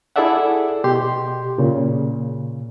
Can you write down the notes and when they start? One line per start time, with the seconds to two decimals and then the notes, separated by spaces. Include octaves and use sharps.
0.16 E4 G#4 A4 D5 E5 F#5
0.84 B2 G4 C6
1.58 A#2 C#3